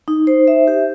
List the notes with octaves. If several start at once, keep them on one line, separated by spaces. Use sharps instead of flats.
D#4
C5
E5
G4